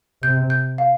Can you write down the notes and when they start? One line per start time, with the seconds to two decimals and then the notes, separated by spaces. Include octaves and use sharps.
0.22 C3 G6
0.50 G6
0.78 F5